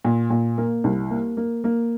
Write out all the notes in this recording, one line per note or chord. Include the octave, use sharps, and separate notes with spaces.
A#2
A#2
A#3
C2
A#3
A#3
A#3